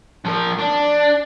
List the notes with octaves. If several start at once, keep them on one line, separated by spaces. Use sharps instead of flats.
F3 A#4
D4